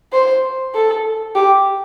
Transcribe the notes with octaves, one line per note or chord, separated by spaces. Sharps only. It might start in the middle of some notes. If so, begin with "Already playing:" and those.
C5
A4
G4